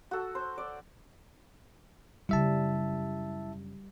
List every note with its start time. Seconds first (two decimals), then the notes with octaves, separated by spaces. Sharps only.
0.11 F#4 A4
0.35 C5
0.58 D5
2.29 F#2 C#3 G3 E4 E5 A5